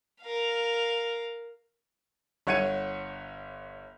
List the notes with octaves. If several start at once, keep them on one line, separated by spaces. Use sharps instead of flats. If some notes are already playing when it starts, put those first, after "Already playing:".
A#4 F5
G1 C#5 F#5 G#6 C#7 D#7